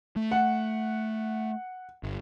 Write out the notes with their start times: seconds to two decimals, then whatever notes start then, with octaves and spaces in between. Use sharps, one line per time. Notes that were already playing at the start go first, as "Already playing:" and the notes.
0.16 A3
0.31 F#5
2.03 G1